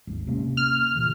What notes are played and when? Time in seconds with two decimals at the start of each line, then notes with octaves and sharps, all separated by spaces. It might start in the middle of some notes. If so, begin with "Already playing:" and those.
0.07 G#1 D#2
0.27 C3 A#3 C#4
0.57 F6
0.95 A#2 C#3 E3